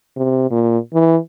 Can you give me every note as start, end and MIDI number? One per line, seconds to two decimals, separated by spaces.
0.17 0.47 48
0.51 0.79 46
0.94 1.17 52